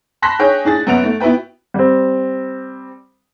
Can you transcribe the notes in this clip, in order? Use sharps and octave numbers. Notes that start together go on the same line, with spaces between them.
A5 B5 C6 F#6 A#6 B6
D4 G#4 C#5 G5 G6
A2 D4 G#4 A6
F#2 B3 F#5 D7 F7
A3
B3 E4 F#4 B4 G5
G3 C4